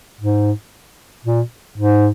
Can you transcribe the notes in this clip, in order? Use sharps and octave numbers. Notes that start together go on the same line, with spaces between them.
G#2
A#2
G#2